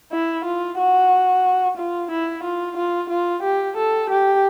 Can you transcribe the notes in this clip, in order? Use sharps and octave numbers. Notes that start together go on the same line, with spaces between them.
E4
F4
F#4
F4
E4
F4
F4
F4
G4
A4
G4